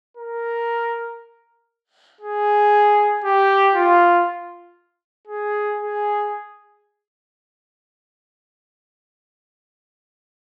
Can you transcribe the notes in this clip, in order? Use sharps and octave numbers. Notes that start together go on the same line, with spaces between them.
A#4
G#4
G4
F4
G#4
G#4